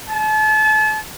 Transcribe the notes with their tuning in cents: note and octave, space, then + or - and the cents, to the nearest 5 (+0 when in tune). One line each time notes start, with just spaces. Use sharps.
A5 -35